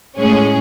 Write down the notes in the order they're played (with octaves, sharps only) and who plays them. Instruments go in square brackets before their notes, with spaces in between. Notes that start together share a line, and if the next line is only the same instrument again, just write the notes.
[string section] A2 G#3 C#4 G#4